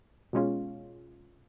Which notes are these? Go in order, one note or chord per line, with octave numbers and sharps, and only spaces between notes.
B2 G#3 C#4 F4